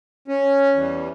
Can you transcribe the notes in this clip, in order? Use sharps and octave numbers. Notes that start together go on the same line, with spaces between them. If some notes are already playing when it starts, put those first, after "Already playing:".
C#4
E2 E3 G3